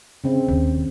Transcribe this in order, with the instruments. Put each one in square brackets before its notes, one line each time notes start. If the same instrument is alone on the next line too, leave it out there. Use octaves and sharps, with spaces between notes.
[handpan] C#3 C4
[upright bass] D#2